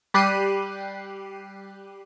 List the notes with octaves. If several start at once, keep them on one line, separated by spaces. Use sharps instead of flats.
G3 G4 F#6 C7 D#7